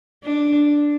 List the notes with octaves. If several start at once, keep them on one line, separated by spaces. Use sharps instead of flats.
D4